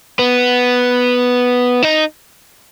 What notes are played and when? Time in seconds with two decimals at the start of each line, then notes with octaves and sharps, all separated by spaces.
0.19 B3
1.83 D#4